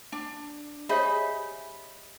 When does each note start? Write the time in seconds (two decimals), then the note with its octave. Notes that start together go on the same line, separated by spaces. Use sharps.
0.12 D4
0.89 G4 G#4 C5 C#5 D#5 E5 B5